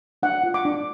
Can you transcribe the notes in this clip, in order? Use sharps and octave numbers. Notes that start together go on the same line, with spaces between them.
D4 F#5
F4
D6
D4